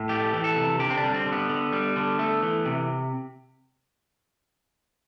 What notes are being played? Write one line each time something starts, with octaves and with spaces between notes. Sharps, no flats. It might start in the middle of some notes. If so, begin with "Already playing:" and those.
Already playing: A2
A3 G4
E3
A4
C3
D3 G4
C4
D4
G3
C4
D3
B3
D3
G3
D3
A3
E3
C3